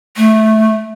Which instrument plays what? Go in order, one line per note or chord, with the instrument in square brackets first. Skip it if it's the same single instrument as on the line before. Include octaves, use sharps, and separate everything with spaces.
[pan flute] A3